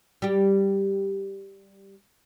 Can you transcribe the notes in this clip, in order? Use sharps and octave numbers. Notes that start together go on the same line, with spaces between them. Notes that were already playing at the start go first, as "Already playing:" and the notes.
G3 G4